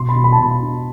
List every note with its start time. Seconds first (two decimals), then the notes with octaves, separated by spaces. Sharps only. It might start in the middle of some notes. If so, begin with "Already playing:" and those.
Already playing: B2 C6
0.09 B5
0.15 B2
0.24 B5
0.32 A5
0.39 B2 B5
0.62 D4